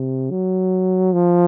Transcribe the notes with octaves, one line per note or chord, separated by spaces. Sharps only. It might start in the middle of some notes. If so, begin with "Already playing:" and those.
Already playing: C3
F#3
F3